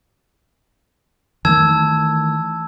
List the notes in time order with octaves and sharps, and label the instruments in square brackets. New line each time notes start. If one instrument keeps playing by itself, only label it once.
[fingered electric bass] D#3 E3 A3 [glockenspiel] A5 E6 G#6